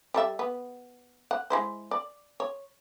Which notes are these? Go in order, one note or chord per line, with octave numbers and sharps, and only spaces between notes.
G3 A4 E5
B3
F#5
G#3 E4 C5
D5
C#5